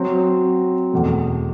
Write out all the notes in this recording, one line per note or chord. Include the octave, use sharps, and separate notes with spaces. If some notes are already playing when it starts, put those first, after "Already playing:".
Already playing: F#3 C4 F#4
E2 B2 A3